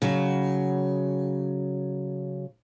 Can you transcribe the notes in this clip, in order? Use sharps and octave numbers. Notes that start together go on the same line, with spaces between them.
C#3 F#3